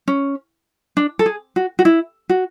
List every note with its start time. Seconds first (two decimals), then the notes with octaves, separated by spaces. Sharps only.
0.08 C#4
0.97 D4
1.19 A4
1.26 G#4
1.56 F#4
1.79 F#4
1.85 E4
2.29 F#4